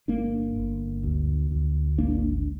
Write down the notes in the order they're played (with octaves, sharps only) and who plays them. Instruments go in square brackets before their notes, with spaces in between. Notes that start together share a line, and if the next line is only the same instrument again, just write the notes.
[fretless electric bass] G1 A#3 D4
G1
D2
D2
G#1 A#3 D4
D4